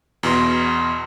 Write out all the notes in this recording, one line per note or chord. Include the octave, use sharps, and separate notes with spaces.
E2 B2 C6